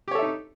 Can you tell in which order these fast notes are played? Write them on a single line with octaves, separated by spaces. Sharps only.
G4 C#5 A4 E5 D#4